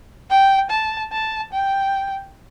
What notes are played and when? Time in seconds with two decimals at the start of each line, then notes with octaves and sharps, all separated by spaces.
0.30 G5
0.70 A5
1.12 A5
1.53 G5